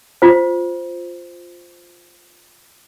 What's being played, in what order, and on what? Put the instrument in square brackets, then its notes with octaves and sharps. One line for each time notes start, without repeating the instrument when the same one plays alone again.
[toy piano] F4 C5